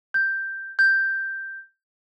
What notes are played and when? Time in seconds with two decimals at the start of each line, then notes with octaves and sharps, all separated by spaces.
0.14 G6
0.79 G6